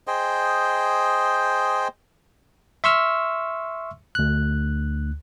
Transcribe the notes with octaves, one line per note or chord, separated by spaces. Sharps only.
G#4 C5 D#5 G5
E5 C6 C#6 E6 F6
D2 F#6